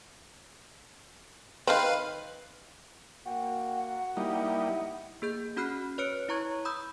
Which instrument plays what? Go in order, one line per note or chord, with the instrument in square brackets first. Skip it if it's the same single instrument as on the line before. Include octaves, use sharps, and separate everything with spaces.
[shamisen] D#3 C4 [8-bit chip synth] B4 F5
[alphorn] A#3 [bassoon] F#4 [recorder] G5
[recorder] F#5
[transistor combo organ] G3 A#3 D#4 [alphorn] E4
[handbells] A#3 G#4 G6
C#4 F#4 B5 F6 F#6 C7
B4 C#5 F6 F#6 C#7 D7
E4 C#5 A#5 C#6 G#6
B5 D#6 E6 G6